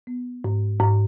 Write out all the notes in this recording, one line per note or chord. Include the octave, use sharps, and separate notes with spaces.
B3
G#2
G#2